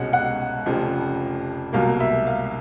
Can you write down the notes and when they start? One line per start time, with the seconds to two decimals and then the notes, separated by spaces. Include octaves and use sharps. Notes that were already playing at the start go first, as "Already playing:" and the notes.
Already playing: C2 B2 G#3 C#4 F#5
0.13 F#5
0.66 F1 F2 C#3 F3
1.73 C2 B2 F#3 A#3 F5
2.00 E5
2.27 F5